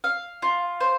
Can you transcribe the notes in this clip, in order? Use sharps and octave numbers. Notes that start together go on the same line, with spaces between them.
F5
F4
C5